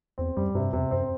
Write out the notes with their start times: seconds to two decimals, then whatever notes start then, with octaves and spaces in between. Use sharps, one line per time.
0.18 E2 C4
0.37 F#2 G3
0.55 G2 C3
0.73 E2 C3
0.91 F#2 C4